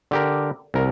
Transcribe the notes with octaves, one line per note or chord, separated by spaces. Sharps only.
D3 G4 A#4
C2 A#4